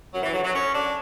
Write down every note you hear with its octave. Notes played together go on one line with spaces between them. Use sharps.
F#2 F#3
E3
D3 F#3
F#3
F#2 C#4
D3 D4